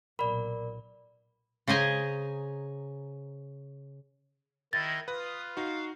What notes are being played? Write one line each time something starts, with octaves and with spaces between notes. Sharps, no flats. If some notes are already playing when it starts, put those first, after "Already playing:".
B1 A#2 A#4 D5 B5
C#3 C5 D#5 G#5 A#5
D#3 E4 D#5 G#6 A6
F4 B4 D#6
D#4 F#4 F5